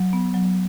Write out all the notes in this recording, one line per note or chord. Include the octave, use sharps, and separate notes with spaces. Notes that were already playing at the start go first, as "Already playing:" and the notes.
Already playing: F#3
B3
F#3